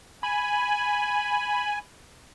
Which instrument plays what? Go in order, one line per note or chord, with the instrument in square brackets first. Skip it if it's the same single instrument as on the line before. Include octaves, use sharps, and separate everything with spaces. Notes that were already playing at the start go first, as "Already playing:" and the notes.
[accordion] G#5 [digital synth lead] B5